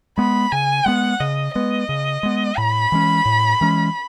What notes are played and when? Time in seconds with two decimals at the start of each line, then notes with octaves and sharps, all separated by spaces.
0.18 G#3 B3 B5
0.52 C#3 G#5
0.86 G#3 B3 F#5
1.20 C#3 D#5
1.54 G#3 B3 D#5
1.89 C#3
2.23 G#3 B3
2.57 A2 B5
2.92 E3 G#3 C#4
3.26 A2
3.61 E3 G#3 C#4